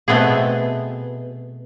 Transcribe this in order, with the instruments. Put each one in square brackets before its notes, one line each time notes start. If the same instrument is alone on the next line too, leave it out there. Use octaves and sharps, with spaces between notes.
[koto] B2 A3 B3 C4 G#4